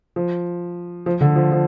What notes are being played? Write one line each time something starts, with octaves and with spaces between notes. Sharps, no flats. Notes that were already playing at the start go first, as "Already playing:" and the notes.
F3
F3
D3
F3
F3